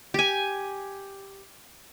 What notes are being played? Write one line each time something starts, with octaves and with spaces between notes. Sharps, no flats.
G4 G#5